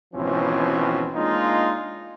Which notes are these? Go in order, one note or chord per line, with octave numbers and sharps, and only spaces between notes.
G#1 B2 E3 F3 C4 C#4
G#3 A#3 D4 D#4 F4